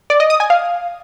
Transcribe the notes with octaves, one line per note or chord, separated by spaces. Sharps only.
D5
D#5
D#6
G#5
F5